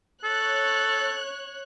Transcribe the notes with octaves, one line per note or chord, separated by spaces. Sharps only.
A4 C#5 F#6